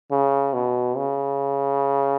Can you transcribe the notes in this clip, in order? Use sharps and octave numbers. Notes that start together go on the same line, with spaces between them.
C#3
B2
C#3